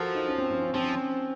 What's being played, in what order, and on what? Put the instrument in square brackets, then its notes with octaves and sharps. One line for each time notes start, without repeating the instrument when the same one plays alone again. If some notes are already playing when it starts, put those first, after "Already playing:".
Already playing: [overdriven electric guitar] F3 [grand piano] F#4 A4 A#4
[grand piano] D#4
C#4
C4
C4
C#4
[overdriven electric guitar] F3 [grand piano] C4
[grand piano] C#4